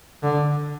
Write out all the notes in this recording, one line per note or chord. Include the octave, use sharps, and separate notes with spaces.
D3